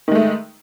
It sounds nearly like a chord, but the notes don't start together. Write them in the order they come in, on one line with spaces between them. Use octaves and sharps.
D#3 G#3 A3